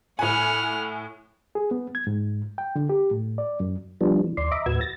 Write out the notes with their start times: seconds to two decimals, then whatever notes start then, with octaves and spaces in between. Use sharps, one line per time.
0.19 A2 F#5 G#5 B5 F6
1.55 G#4
1.71 B3
1.95 G#6
2.07 G#2
2.58 G5
2.76 D3
2.89 G4
3.11 A2
3.38 D5
3.60 F#2
4.01 F3 G3 B3 D4
4.24 E3
4.37 D#2 D5 C6
4.52 D#5 E5 A#5 B5 D6
4.66 D#2 A2 F#4 B4 E6 G#6
4.81 A6 A#6